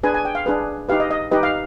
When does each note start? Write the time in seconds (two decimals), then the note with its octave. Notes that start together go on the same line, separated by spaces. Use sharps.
0.03 D4 G#4 B4 G#5
0.14 G#5
0.25 G5
0.35 F5
0.46 D4 G#4 B4
0.89 D#4 G4 B4 F5
1.00 D#5
1.11 D#5
1.31 D#4 G4 B4 D#5
1.43 F5